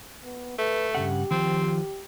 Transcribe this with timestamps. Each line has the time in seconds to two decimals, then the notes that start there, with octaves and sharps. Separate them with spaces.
0.24 B3
0.59 A3 B4
0.95 G2 C#3 G4 F#5
1.31 D#3 F3 C4 F4